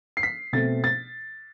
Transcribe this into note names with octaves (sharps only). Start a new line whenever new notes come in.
C7
B6
B2 A3 C4 A6
A6